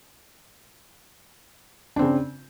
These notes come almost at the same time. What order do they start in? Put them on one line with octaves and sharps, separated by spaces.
D4 C4 C#3